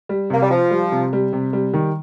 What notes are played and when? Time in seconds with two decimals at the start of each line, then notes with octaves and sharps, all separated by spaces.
0.09 G3
0.30 C3 A#3
0.42 G3
0.50 F3 F4
0.71 G3
0.92 C3
1.13 G3
1.33 C3
1.53 G3
1.74 D#3